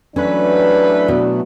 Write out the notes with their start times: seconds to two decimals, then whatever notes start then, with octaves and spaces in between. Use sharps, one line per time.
0.16 E3 F#3 A3 C#4 D4 A4 B4
1.08 B2